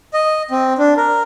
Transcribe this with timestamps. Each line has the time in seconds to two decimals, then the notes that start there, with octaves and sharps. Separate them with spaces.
0.14 D#5
0.51 C4
0.78 D4
0.97 A#4